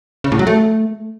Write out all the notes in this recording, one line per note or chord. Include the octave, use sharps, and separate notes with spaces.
C#3
A2
F#3
A3